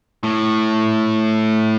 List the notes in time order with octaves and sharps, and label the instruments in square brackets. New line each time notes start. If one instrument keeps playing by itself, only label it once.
[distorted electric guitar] A2